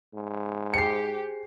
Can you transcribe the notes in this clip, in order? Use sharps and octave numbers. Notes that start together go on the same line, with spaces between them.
G#2
G4 G#4 C5 G#5 C7 C#7